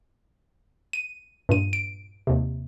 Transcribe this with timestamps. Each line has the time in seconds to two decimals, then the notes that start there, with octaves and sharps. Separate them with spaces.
0.93 D#7
1.49 G2 A#2 D#7
1.73 D7
2.27 D#2 C3